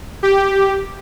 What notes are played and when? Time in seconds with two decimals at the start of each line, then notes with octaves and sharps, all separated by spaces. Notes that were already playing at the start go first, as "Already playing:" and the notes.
0.23 G4